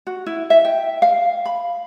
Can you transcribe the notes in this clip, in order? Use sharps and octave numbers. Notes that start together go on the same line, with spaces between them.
F#4
E4
E5
G5
F5
B5